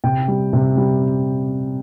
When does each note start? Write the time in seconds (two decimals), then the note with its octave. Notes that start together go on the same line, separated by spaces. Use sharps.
0.04 C3 G5
0.28 G3
0.53 C3
0.77 G3